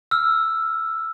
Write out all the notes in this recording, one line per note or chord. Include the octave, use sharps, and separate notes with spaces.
E6 F6